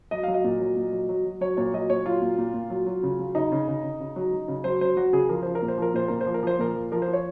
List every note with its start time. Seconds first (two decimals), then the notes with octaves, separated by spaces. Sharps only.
0.11 F#3 D#5
0.23 F#3 F5
0.34 D#5
0.44 A#2
0.60 F#3
0.76 A#2
0.92 F#3
1.09 F#3
1.25 F#3
1.41 F#3 C#5
1.57 A#2 C#5
1.73 F#3 D#5
1.90 A#2 C#5
2.06 F#3 F4
2.22 A#2
2.38 A#2
2.54 A#2
2.70 F#3
2.86 F#3
3.03 C#3
3.19 F#3
3.35 C#3 D#4
3.52 C#3
3.68 C#3
3.83 C#3
4.00 C#3
4.16 F#3
4.33 F#3
4.48 C#3
4.64 F#3 C5
4.81 F#3 C5
4.96 F#3 F#4
5.13 C#3 G#4
5.29 F3 A#4
5.43 F3 C5
5.55 A#4
5.62 A#2
5.68 C5
5.78 F3 A#4
5.94 A#2 C5
6.08 A#2 A#4
6.21 C5
6.26 F3
6.34 A#4
6.43 F3 C5
6.59 A#2 A#4
6.75 F3
6.92 F3 A#4
7.02 C5
7.08 F3
7.13 C#5